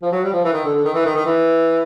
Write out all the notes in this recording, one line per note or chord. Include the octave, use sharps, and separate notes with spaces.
F3
F#3
G3
F3
E3
D#3
D3
D3
D#3
E3
D#3
D#3
E3